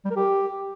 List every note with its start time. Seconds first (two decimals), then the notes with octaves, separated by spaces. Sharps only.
0.05 G3
0.11 A#4
0.16 G4